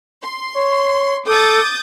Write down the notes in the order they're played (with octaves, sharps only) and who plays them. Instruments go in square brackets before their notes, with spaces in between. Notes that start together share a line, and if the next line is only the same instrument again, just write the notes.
[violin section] C6
[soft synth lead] C#5
[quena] A4 [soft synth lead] D6 [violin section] D#6 G6 A6